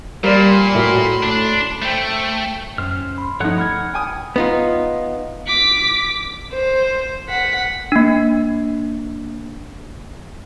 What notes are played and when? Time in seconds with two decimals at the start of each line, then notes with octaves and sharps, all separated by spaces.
0.24 A#2 G3 A#4 C5 D5 B5 C6
0.75 A2 F#4 A#4 E5
1.23 D4
1.82 A3 C5 G5 D7
2.78 F#2 C#4 C5 F6
3.18 B5 C6
3.40 G2 F3 A3 D#4 C#5 F#5 F#6
3.58 F#5 B5 F6 G#6
3.94 G5 G#5 D#6
4.36 B3 D#4 F4
5.47 D6 B6
6.53 C5
7.29 F#5 B6
7.92 A#3 D4